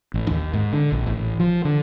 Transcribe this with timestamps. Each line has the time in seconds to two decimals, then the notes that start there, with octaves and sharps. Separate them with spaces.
0.14 A1
0.30 D#2
0.54 G#2
0.73 D3
0.92 A#1
1.07 A1
1.40 F3
1.65 D3